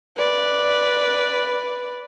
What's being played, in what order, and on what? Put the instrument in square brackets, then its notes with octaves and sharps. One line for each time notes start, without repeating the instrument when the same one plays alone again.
[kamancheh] B4 D5